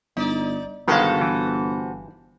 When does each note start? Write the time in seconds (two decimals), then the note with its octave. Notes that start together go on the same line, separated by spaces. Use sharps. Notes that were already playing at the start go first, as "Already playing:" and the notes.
0.17 G1 D#4 D5
0.88 G1 C3 D#3 G#3 F#4 A4 B4 F5
1.21 E3